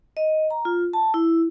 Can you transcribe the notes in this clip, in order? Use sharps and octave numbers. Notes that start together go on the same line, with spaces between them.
D#5
A#5
F4
A5
E4